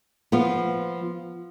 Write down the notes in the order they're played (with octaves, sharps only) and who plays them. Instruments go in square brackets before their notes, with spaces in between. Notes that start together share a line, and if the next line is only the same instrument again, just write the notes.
[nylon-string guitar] F3 B3 F4